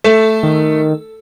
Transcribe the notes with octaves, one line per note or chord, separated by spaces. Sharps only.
A3 A4
D#3